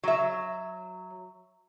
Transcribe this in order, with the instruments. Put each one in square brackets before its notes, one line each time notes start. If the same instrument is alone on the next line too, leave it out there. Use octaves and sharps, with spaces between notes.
[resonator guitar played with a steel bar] F#3 E5